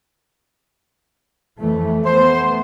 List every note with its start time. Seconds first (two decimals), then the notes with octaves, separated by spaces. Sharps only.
1.60 F2 E3 A3
2.05 A3 B3 C5